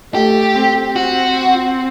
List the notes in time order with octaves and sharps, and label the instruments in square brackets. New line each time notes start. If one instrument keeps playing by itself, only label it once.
[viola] A3 [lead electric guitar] G4
[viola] C4
[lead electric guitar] F#4